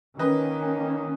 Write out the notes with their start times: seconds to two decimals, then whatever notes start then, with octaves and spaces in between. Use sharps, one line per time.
0.19 D#3 A#3 C#4 B4 D#5